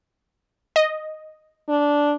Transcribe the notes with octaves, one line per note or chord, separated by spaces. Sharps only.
D#5
D4